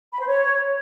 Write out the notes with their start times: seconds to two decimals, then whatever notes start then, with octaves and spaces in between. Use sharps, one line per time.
0.12 B5
0.20 C5
0.27 C#5